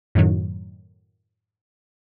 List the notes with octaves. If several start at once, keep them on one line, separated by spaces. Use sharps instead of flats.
F#2 A2 D#3 F#3